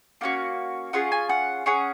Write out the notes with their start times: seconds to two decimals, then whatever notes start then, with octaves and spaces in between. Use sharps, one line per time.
0.21 A#3 C#4 F#4 F#5
0.93 C#4 F4 G#4 F#5
1.12 G#5
1.29 F#5
1.66 C#4 G#4 F#5